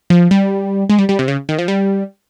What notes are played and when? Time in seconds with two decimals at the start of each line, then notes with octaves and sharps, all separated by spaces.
0.10 F3
0.31 G3
0.90 G#3
0.99 G3
1.09 G3
1.19 C3
1.28 C#3
1.49 D#3
1.59 F3
1.68 G3